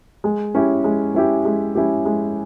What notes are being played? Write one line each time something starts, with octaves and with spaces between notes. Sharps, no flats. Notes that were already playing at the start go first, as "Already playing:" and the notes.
G#3
C#4 E4 G4
G#3
C#4 E4 G4
G#3
C#4 E4 G4
G#3